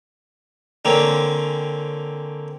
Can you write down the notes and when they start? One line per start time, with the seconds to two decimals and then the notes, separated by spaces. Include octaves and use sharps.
0.85 D3 A#3 C4 C#4